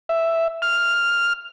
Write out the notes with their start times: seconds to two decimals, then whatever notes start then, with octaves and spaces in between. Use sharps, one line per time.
0.09 E5
0.62 F6